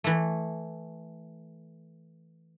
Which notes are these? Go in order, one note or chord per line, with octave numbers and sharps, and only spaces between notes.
E3 A3